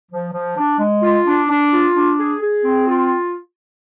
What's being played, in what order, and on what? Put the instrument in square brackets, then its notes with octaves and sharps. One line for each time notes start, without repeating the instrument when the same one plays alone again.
[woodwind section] F3
F3
D4
G#3
F4
D4
D4
F4
D4
G#4
G#4
C4
F4